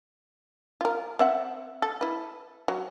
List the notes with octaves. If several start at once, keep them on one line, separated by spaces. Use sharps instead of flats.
F4 A#4
C4 E5 F#5
A4
E4 B4
F#3